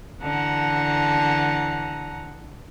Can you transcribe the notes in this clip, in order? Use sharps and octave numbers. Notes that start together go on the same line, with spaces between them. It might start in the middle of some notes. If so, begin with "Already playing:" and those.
D3 E3 F#5 A5 A#5